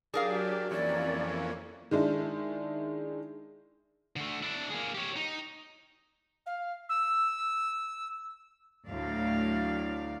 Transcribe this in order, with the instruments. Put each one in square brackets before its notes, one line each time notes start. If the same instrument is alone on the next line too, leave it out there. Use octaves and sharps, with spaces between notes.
[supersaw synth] F#3 G4 [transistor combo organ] D4 [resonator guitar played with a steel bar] G#4 A#4 F5
[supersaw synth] F2 A#3 [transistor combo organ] E3 C#4 [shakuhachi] D5
[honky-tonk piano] D#3 G#3 D4 E4
[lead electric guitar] D3 A3
D4 E4
A#3 G#4
G4 C#5
D#4
[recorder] F5
E6
[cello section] D2 A2 F#3 D5 F5